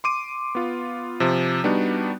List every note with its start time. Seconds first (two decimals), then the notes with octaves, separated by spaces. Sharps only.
0.04 C6 D6 D#7
0.55 B3 F4
1.20 C3 F3
1.64 G3 B3 D4 D#4 F#4